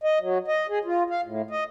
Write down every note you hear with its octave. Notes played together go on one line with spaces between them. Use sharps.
D#5
F#3
D#5
G#4
F4
F5
A2
D#5